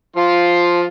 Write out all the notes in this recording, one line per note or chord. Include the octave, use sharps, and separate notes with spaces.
F3 F4 C6